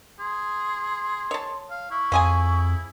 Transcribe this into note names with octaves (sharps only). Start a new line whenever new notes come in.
G#4 C6
C#5 A5
F5
E4 C#6
F2 F3 G#4 G#5